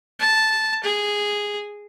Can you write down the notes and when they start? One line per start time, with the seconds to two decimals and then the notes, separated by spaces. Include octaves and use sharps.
0.19 A5
0.84 G#4